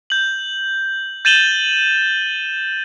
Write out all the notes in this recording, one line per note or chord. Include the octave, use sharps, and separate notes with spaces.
G6 F#7
G6 A6 D#7 E7 F#7 G7